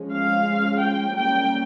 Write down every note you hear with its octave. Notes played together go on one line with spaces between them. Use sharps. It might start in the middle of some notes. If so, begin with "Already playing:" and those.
Already playing: F3 G#3 C#4
F5
G5
G3 A#3 C#4 G5